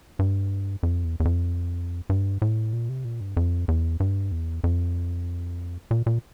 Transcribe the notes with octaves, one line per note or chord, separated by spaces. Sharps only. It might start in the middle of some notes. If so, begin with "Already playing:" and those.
G2
F2
E2
E2
F2
G2
A2
A#2
C3
A#2
G2
F2
E2
G2
E2
F2
A#2
A#2